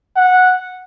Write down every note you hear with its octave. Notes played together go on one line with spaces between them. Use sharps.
F#5